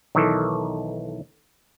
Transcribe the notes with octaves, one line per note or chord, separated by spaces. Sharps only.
B1 D#3 E3 A4